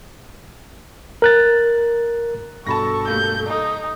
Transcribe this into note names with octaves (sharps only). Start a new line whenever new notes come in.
A#4 F#6 A6
G2 B2 A4 A5 B5 C#6 A#6
G3 A3 A#3 G6
D#4